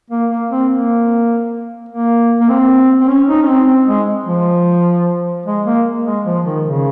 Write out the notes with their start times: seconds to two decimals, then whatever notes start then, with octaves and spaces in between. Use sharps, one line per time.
0.10 A#3
0.30 A#3
0.50 C4
0.70 A#3
1.89 A#3
2.40 A#3
2.49 C4
3.01 C4
3.08 C#4
3.28 D#4
3.42 C#4
3.47 C4
3.67 C4
3.87 G#3
4.27 F3
5.46 G#3
5.66 A#3
6.05 G#3
6.25 F3
6.45 D#3
6.65 C#3